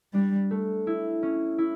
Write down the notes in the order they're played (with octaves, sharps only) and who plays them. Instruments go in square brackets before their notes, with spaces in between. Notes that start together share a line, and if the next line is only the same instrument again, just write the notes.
[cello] G3 [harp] D4
[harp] A3
E4
C#4
E4